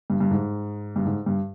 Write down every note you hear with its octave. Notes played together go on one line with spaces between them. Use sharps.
G2
G2
G#2
G2
G#2
G2